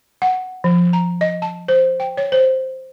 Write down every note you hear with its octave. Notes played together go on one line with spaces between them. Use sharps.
F#5
F3
A#5
D#5
A5
C5
G5
C#5
C5